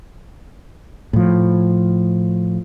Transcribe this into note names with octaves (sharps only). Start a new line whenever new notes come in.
A2 F3